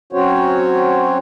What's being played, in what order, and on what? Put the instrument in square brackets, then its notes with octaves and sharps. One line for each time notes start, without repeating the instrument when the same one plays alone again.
[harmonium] F#3 C4 C#4 F#4 C5 C#5